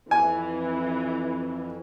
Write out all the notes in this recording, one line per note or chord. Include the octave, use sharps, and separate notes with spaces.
F2 E3 G#5